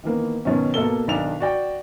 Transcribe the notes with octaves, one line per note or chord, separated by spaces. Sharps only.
D#3 E3 A#3 B3
B2 D#3 F#3 C#4
B2 A#3 A4 G7
B1 D#3 D4 F7
F#4 D5 G5